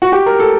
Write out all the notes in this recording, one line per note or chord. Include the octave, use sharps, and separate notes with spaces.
F#4
G4
A#4
A4